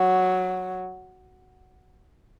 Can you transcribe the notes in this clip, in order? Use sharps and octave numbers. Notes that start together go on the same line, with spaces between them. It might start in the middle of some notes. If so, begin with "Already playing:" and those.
Already playing: F#3